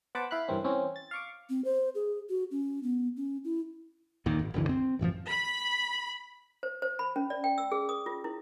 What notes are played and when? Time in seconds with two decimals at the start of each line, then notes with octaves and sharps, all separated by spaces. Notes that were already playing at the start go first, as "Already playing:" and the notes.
0.15 B3 C5 F#5 A5 B5 D6
0.31 E4 F5 B5 F#6
0.48 G2 C3 E3 A#3 C4 C#4
0.64 E3 C4 C#4
0.96 A6
1.11 F5 C#6 D6
1.50 C4
1.65 C5
1.95 G#4
2.29 F#4
2.51 C#4
2.83 B3
3.16 C#4
3.44 E4
4.26 D#2 A#2 D#3
4.39 G#1
4.54 F#1 C2 D3 E3
4.69 C4
4.99 A1 F#2 E3 F3
5.28 B5
6.63 C5
6.82 C5
6.99 B5
7.16 C#4
7.30 D5
7.44 G5
7.58 E6
7.72 G#4
7.89 D#6
8.06 F4
8.24 E4